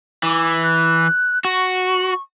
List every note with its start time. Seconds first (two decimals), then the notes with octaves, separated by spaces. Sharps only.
0.23 E3 D6
0.62 F#6
1.45 F#4 C#6